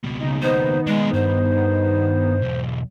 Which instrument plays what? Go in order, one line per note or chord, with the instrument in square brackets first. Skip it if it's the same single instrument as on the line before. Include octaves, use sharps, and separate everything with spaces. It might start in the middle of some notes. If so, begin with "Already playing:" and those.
[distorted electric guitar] C#2 B2
[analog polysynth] C#3 D#4
[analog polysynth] D#3 B3 D#4 [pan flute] C5
[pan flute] G#3 [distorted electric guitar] D4 G#4
[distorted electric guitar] G2 [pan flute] C5
[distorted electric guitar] B1 E2